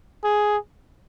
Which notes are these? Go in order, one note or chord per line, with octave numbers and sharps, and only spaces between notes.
G#4